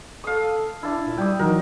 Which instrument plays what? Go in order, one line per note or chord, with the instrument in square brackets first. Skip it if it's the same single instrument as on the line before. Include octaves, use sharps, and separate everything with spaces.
[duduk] A4 [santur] F5 D#6
[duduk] D4 [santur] E4 A5
[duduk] A#2
[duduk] G3 [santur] G5 D#6
[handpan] E3 F#3 F#4 [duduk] D#4 [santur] A#4